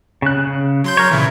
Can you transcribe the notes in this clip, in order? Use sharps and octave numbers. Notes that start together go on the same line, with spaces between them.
C#3 F#6
C#3
F#3 C6 G6
A#4 C#5
A#2 C#3 E3 E4